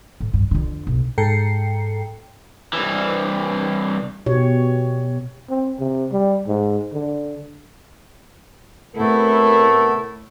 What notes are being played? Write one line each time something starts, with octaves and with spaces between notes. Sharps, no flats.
A2
G2
F2 D3
B1
G#2 A4 G5 A#5 C7 C#7
C2 E3
B2 G4 C#5
C4
C3
G3
G#2
D3
A2 C3 A3 B3 E4 A4 A#4